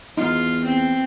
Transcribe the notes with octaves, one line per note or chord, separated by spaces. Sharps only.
E2 D#4 F4
C4